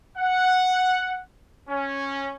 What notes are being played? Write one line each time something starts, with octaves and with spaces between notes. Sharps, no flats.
F#5
C#4